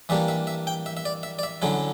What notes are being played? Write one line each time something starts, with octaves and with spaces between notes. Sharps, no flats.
E3 G3 A#3 D4 E5
E5
E5
G5
E5
E5
D5
E5
D5
E5
D3 F#3 C#4 E4